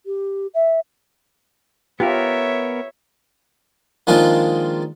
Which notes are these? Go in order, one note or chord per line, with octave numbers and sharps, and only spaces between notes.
G4
E5
B3 F4 G4 A#4 C#5 E5
D#3 F3 G#3 A#3 D4 F4